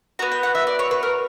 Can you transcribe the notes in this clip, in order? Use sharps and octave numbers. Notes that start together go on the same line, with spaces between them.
B3 F#4 A#5
G5
F#5
E5
D5
C#5
B4
A#4